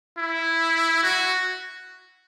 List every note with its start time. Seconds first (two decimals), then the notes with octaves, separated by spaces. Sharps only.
0.18 E4
1.03 F#4